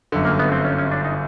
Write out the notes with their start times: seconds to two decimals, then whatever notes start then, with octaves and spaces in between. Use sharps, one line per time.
0.12 G1 F#2 D3
0.25 A#3
0.39 B3
0.52 C4
0.65 C#4
0.78 C#4
0.92 D4
1.04 D#4